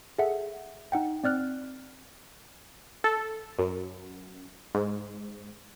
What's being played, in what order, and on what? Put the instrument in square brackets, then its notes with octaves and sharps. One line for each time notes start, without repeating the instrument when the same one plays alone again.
[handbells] G#4 A4 E5 F#5
D#4 F#5 G5
C4 D5 F6 F#6
[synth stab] A4
F#2
G#2